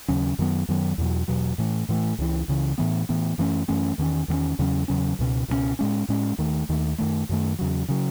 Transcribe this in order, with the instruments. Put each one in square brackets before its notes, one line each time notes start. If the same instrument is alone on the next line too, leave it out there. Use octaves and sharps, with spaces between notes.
[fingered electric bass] D#2 C#3 F#3 C#4
F#2 D#3 F#3 B3
F#2 D#3 F#3 B3
E2 B2 F#3
E2 B2 F#3
A2 E3 A3
A2 E3 A3
C#2 C#3 E3
C#2 C#3 E3
A2 E3 B3
A2 E3 B3
F#2 E3 A3 C#4
F#2 E3 A3 C#4
E2 D#3 A3 C#4
E2 D#3 A3
C#4
E2 C#3 F#3 C#4
E2 C#3 F#3 C#4
C#2 B2 G#3 C#4
C#2 B2 G#3 C#4
A2 G#3 C#4
A2 G#3 C#4
D#2 D#3 A3
D#2 D#3 A3
F#2 D#3 A3
F#2 D#3 A3
E2 C#3 F#3
C#3 F#3